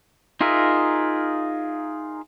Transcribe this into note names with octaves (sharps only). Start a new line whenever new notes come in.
D#4 F4 G#4 A#4 E5